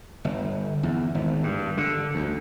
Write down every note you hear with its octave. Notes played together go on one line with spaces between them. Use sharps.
G1
E2
G#1
G2
D3
D2